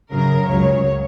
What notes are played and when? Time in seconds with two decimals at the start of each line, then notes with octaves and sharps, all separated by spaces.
0.11 F#2 C#3 F#3 A#4
0.49 C#2 C#3 F#3 C#5